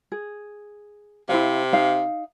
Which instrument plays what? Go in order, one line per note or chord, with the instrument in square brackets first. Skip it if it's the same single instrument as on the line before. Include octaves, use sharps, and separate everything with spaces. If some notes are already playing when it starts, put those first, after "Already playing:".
[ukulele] G#4
[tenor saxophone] C3 [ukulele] E4 C5 F5
[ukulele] D#4 F5